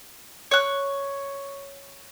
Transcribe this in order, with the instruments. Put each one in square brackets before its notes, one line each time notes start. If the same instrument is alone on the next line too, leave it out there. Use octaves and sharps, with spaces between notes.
[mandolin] C#5 F#6